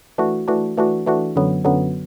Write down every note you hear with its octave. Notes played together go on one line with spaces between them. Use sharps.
E3 A3 D4 F#4
E3 A3 D4 F#4
E3 A3 D4 F#4
E3 A3 D4 F#4
F#2 D3 F#3 B3
F#2 D3 F#3 B3